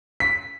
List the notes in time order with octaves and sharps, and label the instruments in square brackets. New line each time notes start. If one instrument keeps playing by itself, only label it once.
[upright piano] B6